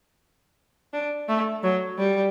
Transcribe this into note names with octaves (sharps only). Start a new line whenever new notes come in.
D4
A3
F#3
G3